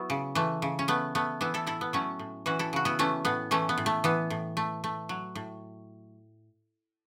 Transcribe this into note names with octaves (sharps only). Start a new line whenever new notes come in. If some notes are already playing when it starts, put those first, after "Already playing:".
Already playing: F#3 B3 E4
C#3
E3 A3
C#3
C#4
A3 B3
A3 B3
E3 B3 E4
E4 A4
A2 E4 A4
B3
F#3 A3 C#4
A2
E3 C#4 F#4
E4 A4
C#3 F#4
B3 E4
E3 A3 C#4
A2 B3
E3 A3 C#4
B3
A2
A3
E3 B3
A2
A3
A3
F#3
A2